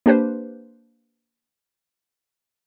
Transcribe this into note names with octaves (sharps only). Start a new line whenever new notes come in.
A#3 D4 G4 B4 C5